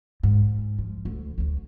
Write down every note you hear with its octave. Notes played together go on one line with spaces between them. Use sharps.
G#2
F3
D2
D2 F#3